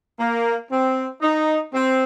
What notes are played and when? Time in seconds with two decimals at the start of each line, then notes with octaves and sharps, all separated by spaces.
0.19 A#3
0.70 C4
1.21 D#4
1.73 C4